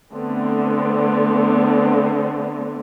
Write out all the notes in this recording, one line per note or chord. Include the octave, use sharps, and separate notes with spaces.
D3 A3 B3 C4